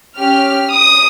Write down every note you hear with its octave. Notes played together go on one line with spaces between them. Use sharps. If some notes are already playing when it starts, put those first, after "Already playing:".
C#4 G4 F6
D#6